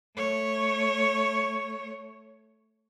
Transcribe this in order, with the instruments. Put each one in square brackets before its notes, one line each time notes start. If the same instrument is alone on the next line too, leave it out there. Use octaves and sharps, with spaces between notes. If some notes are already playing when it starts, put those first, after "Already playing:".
[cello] A3 C#5